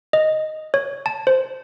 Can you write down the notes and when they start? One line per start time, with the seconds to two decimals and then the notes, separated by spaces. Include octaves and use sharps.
0.13 D#5
0.74 C#5
1.06 A5
1.27 C5